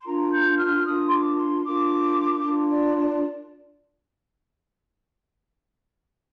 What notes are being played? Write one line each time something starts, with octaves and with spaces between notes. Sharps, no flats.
C6
D4 F4 A#4 A#5
G6
F6
D4 F4 A#4 D#6
C6
D6
C6
D4 F4 A#4 D6
D4 F4 A#4
D5
D5